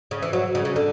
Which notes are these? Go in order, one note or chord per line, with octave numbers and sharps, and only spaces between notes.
C#3
E3
F#3
C#3
C#3
D3